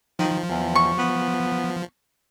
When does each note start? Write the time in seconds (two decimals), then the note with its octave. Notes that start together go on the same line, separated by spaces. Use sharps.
0.19 D#3 F3
0.50 E2
0.75 C#6
0.99 B3